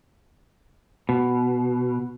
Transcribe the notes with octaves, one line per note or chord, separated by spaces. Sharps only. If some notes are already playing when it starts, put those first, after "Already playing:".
B2